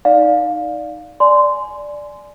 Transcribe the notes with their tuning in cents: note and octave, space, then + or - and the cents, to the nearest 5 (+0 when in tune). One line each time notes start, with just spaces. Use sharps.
D#4 +0 D5 +0 F5 +15
D5 +0 G#5 +15 C6 -15